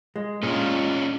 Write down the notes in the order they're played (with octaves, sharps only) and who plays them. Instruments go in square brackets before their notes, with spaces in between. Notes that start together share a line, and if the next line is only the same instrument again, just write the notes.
[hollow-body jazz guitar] G#3
[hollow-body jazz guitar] A#2 G#3 [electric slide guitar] C#4 D4 F4